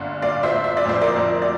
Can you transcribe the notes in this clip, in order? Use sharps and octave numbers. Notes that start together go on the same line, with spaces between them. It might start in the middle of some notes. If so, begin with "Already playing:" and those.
Already playing: G1 D3 F5
G1 D5 F5
C5 E5
G1
E5
D5
F2 C5
A#4 D5
F2
D5